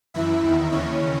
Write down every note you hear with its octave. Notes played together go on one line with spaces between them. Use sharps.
F#2 E3 E4 E5
E2 D#3
D#2 C#3 E3 C#4 C#5